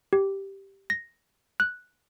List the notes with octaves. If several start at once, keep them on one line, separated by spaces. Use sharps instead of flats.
G4
A#6
F#6